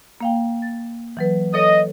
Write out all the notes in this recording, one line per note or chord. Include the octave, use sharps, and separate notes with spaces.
A#3 F5 G5
A6
E3 F#3 B4
A4 C#5 D#5